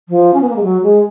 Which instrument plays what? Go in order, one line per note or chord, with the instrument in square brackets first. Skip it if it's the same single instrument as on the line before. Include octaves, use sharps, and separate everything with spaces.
[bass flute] F3
C#4
B3
A#3
G#3
F#3
G#3